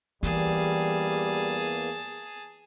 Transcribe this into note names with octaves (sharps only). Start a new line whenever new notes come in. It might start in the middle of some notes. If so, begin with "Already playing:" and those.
E2 E3 G3 A#3 G#4 A5